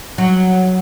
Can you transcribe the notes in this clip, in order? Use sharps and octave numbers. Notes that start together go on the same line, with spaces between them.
F#3